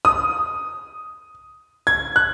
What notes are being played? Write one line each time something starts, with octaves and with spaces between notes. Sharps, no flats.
D#6
G#6
F#6